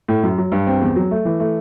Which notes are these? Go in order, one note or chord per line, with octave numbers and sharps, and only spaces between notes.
A2
F#2
F#3
G2
C4
E2
F#3
A3
E3
A3